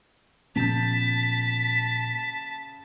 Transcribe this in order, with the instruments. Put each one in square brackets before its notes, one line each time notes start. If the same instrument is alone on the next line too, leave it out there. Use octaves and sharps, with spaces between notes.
[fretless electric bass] A#2 F3 B3 [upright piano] C#3 G6 [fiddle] A5 [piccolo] B6